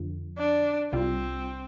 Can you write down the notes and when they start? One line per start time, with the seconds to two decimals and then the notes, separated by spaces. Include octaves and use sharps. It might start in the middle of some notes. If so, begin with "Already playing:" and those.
Already playing: F2 D3 F3
0.38 D4
0.92 C2 C3 G3 C4 F4